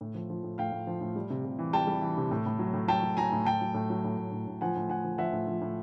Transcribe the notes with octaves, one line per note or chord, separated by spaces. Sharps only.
A2
F3
F3
A2
A2 F5 G5
A2
F3
A2
G3
C3
C3
E3
G3 G5 A5
G3
E3
C3
A2
A2
F#3
A2
F#3 G5 A5
F#3
F#3 G#5 A#5
A2
A2 G5 A5
F#3
A2
F#3
A2
A2
A2
A2
F3 F#5 G#5
A2
A2 F#5 G#5
F3
F3 E5 F#5
A2
F3
A2